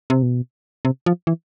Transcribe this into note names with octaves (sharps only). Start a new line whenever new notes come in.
C3
B2
C3
F3
E3